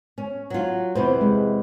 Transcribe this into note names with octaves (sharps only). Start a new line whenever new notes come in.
C#4
F#3 F4
E2 C3 B4 C5
G#3